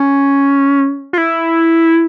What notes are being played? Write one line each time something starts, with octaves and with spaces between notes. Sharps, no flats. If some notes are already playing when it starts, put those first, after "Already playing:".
Already playing: C#4
F4
E4